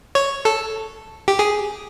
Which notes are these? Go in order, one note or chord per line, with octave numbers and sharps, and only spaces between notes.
C#5
A4
G4
G#4